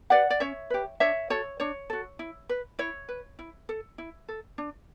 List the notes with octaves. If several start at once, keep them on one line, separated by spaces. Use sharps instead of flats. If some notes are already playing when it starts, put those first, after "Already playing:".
G4 B4 D5 F#5
D5
C#4 C#5 E5
G4 B4
D4 C#5 E5
F#4 A4 C#5
D4 C#5
F#4 A4
E4
B4
E4 C#5
B4
E4
A4
E4
A4
D4